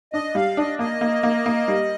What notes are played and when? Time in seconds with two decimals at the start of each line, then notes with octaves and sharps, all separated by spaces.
0.13 D4 D#5
0.35 G3 F5
0.57 D4 D#5
0.79 A#3 D#5
1.01 A#3
1.23 A#3
1.46 A#3
1.68 G3